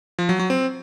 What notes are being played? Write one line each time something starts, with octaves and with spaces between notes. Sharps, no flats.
F3
F#3
F#3
C4